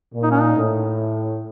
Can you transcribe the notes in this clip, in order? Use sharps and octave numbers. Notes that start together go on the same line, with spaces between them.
A#2
D#4
C#4
D#4
A2